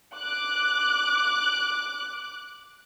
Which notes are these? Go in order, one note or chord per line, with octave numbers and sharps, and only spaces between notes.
D6 F#6